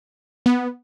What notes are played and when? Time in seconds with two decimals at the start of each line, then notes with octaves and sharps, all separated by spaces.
0.46 B3